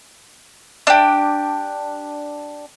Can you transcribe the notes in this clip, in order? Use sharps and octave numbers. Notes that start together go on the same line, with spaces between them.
D4 G4